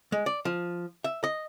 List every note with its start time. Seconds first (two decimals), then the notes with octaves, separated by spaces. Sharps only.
0.12 G#3
0.26 D5
0.45 F3
1.04 E5
1.24 D#5